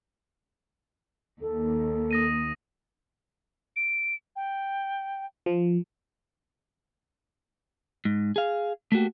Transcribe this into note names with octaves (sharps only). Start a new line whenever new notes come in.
D#2 A4
D#6 A#6 D#7
D7
G5
F3
G#2
G#4 F5
A3 A#3 F#4 G4